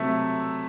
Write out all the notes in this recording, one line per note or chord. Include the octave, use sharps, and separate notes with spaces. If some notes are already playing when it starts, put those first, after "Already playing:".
Already playing: C3 F#3 A3 E5